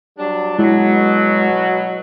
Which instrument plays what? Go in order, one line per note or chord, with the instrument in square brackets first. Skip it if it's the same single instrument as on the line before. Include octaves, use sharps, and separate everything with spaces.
[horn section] F#3 G3 D4
[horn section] B2 F#3 [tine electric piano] G#3 E4